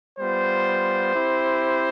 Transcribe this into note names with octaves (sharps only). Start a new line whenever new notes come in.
G3 B3 F4 C5
C4 E4 G4